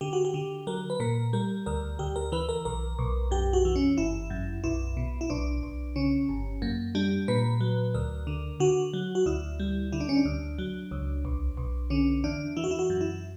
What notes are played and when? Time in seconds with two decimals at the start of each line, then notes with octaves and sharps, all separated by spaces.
0.01 D3 G4
0.13 F#4
0.25 G4
0.34 D3
0.67 F#3 A#4
0.90 B4
1.00 A#2 A#4
1.33 G3 A#4
1.66 D2 A#4
1.99 D2 G4
2.16 A#4
2.32 E3 B4
2.49 A#4
2.65 B1 A#4
2.99 B1
3.31 F#2 G4
3.53 F#4
3.65 E3
3.76 C#4
3.97 G1 E4
4.30 F#2
4.64 B1 E4
4.97 B2
5.21 E4
5.30 B1 D4
5.63 B1
5.96 C#3 C#4
6.29 G1
6.62 F#2 A#3
6.95 G3 D4
7.28 A#2 B4
7.60 F#3
7.94 D2 A#4
8.27 D3
8.60 D3 F#4
8.93 F#3
9.15 F#4
9.26 D2 E4
9.60 G3
9.92 D3 E4
10.00 D4
10.09 C#4
10.17 D4
10.25 D2
10.58 F#3
10.91 C#2
11.25 B1
11.57 B1
11.90 D3 C#4
12.24 E2 D4
12.57 E3 E4
12.64 F#4
12.71 E4
12.79 F#4
12.90 F#2
13.01 E4